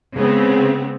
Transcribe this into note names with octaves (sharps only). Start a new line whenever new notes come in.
C#3 G#3 B3 C4